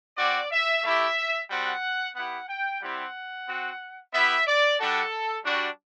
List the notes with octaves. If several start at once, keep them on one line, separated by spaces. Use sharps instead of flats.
C4 F#4 D5
E5
A3 E4 G4 E5
G3 C4 F#4 F#5
B3 E4 G4 F#5
G5
G3 C4 E4 G4 F#5
C4 F#4
B3 E4 G4 E5
D5
G3 D4 F#4 A4
G3 D4 F#4